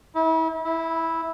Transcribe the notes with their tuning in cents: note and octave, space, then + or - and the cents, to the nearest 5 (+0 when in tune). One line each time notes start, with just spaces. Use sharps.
E4 -35
E4 -10